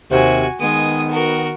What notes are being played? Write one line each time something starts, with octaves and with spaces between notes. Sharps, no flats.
D#2 C3 F#4 G#5
D#3 G#3 B3 D#6
F#4 A#4